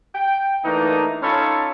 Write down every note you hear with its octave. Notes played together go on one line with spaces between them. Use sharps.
G5
E3 A3 A#3 D4 D#4
C#4 D#4 F4 A4 C#5 B5